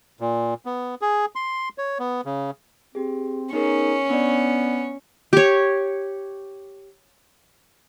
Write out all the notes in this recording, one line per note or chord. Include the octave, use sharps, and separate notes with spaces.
A#2
B3
G#4
C6
C#5
B3
C#3
C4 G4 G#4
B3 C#4 D#4 G#4 A#4 C#5
B3 D4 D5
G4 C#5